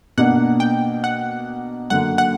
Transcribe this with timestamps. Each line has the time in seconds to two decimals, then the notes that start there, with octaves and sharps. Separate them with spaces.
0.17 B2 A#3 D4 F#5
0.60 G5
1.04 F#5
1.90 F#2 D3 A#3 F#5
2.18 F#5